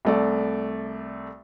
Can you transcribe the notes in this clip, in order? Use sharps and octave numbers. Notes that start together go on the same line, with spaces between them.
C2 A3 D5